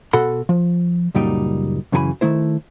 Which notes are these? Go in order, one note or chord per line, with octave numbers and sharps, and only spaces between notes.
B2 F#4 A4 F#5 B5 C6
F3
C#2 F#2 A#2 G3 D#4 G5
F#2 C#3 E3 G#4 G#5 B5
D#3 A3 E4 C5